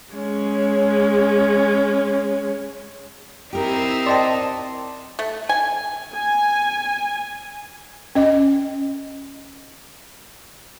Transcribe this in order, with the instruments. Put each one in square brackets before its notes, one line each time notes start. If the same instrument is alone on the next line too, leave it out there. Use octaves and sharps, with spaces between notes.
[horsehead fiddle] G#3 C#4
[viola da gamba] C4 D#4 E4 [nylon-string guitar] G4 A#4
[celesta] C5 G5 C6 [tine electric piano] D5 D#5 A5
[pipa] A3
G#5
[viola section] G#5
[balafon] C#4 D#5